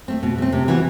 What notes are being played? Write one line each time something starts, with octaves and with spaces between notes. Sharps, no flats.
A3 C4
B2
A3 C4
C3
E3 B3 F#4